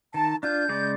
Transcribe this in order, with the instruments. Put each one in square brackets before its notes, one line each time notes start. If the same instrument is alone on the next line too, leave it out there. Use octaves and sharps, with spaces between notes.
[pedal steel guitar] D#3 [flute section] A5
[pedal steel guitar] D4 F4 [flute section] G6
[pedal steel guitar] C#3 G#3 D5